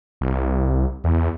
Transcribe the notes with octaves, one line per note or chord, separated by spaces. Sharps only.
C2
E2